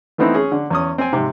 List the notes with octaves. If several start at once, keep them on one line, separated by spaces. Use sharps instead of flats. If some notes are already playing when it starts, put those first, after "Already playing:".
E3 A3 B3 C4 D#4 E4
C#4 G#4
D3
E2 C#4 D#6
C4 G5 G#5
G#2 C3